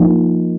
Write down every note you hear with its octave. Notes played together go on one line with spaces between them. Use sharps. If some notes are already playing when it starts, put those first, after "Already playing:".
Already playing: F3 A#3 D#4